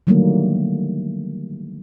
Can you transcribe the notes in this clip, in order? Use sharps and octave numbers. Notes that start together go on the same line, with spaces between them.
D3 D#3 F#3 G3 A3 A#3